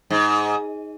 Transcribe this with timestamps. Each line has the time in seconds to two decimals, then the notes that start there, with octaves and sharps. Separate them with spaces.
0.11 G#2